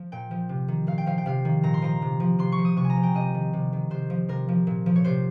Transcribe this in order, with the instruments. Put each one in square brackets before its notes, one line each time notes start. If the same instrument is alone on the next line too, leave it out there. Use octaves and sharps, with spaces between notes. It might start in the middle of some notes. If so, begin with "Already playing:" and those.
Already playing: [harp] F3
A#2 G5
F3
C3
D#3
A#2 F5
G5
F3 F5
G5
C3 F5
D#3
A#2 A#5
C6
F3 A#5
C3
F3
C3 C6
C#6
F3
D#6
C3 C#6
G#5
A#5
F3
G5
C3 D#5
D#3
C3
D#3
C3 C5
F3
C3 A#4
F3
A#2
F3
C#5
C3 C5